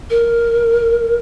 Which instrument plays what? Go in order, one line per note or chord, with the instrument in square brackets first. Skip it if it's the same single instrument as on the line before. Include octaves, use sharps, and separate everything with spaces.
[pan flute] A#4